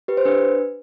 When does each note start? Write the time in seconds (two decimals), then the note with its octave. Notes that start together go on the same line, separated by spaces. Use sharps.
0.08 G4 B4
0.17 C5
0.25 D4 B4